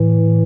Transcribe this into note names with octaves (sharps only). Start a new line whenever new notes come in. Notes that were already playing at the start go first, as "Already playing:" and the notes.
Already playing: A2 E3